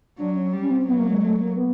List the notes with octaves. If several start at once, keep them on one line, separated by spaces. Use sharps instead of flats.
F#3 D4
C#4
G3
C#4
C4
F#3 B3
A#3
G#3
A3
A#3
B3